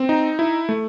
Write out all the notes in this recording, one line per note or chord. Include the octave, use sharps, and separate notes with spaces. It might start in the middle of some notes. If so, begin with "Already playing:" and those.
Already playing: C4
D#4
E4
A3